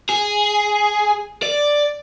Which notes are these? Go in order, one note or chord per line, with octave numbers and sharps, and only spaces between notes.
G#4
D5